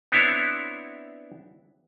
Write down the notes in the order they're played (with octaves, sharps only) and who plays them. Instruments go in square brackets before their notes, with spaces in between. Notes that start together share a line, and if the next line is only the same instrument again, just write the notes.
[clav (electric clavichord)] B3 C4 D4 E4 C#5